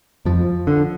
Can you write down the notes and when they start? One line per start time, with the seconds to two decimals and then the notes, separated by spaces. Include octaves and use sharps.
0.25 F2 F3
0.67 D3